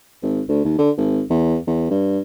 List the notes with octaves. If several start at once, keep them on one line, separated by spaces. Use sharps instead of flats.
G#1
D2
D#2
D3
G#1
E2
E2
G2